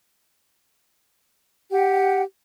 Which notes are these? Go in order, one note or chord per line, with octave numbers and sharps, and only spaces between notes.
G4 F#5 G5